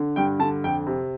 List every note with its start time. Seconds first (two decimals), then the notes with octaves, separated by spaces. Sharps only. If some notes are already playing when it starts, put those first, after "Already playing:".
Already playing: D3
0.16 G2 G5
0.39 D3 A5
0.64 F2 G5
0.87 C3